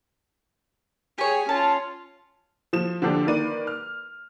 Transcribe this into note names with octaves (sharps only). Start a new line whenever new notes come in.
G4 G#4 C#5 G#5
C#4 F4 A5
F3 E7
D3 F3 D4 G4 A4
D#3 A#3 B4 D5 D#7
F6